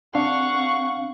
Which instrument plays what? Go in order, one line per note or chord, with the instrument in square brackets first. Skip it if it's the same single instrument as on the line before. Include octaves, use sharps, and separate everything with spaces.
[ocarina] C4 [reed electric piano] D4 [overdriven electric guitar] F5 [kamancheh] F#5 C#6